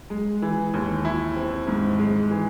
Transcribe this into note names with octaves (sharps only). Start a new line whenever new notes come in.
G#3
E3
D#2
E4
C4
G#2
G#3
E3